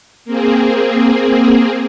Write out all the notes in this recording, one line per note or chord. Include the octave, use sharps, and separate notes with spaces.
A#3 C4 G#4